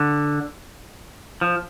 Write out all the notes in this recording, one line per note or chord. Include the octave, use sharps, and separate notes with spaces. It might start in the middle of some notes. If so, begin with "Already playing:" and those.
Already playing: D3
F3